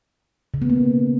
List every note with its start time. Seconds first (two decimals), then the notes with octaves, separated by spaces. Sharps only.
0.54 C#3
0.62 B3
0.70 A#3